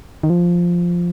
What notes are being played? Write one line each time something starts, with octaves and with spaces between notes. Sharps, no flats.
D#3
F3